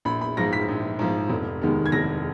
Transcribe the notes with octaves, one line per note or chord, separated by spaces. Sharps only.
A#1 B5
B5
G#2 F3 A#6
B6
A#1
G#2 F3
F1
D#2 D#3 G#3 B3
G#6
F1 A#6